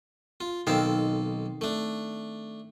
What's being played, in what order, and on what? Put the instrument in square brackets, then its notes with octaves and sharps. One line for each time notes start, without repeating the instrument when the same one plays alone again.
[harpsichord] F4
[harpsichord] B1 A4 F5 [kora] D#3 C4
[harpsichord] A3 D4